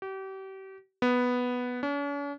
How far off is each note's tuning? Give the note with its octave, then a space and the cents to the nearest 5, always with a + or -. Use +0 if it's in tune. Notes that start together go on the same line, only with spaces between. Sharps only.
G4 -35
B3 +0
C#4 +45